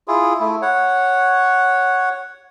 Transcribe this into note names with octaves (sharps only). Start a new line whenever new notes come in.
E4 F4 G#4
A3 E4
C#5 F#5